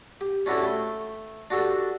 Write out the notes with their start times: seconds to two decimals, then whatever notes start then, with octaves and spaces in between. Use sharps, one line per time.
0.21 G4
0.46 C#4 D4 E4 F#4 G4 A4
0.62 A3 G5 B5
1.50 D4 F#4 G4 A4